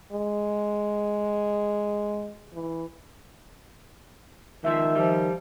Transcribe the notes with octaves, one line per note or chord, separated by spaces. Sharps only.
G#3
E3
C#2 D#3 F3 E5
F3 G3